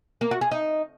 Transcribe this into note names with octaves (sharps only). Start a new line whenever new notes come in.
A#3
F#4
G#4
D#4